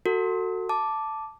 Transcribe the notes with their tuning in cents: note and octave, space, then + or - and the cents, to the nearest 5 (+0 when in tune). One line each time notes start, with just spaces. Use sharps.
F#4 +0 A4 +35
A5 +0 D6 +0